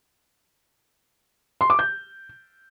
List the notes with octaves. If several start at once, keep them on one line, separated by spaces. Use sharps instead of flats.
C6
D6
G6